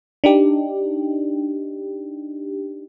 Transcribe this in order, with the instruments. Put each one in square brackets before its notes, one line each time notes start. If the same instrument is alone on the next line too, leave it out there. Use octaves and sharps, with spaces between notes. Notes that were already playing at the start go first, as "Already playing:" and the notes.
[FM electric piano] D4 D#4 G4